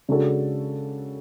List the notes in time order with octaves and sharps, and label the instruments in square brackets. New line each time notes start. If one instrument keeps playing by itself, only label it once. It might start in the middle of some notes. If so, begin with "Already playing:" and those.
[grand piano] C#3 G#3 D4 F#4 A4